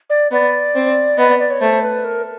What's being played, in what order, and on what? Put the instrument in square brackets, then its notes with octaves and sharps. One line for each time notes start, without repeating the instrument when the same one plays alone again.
[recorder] D5
[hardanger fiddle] B3 [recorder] D5
[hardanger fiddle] C4
[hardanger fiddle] B3 [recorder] D#5
[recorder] D5
D5
C#5
[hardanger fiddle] A3 [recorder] C5
[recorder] B4
A#4